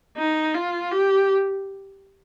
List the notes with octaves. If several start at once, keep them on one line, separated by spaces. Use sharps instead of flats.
D#4
F4
G4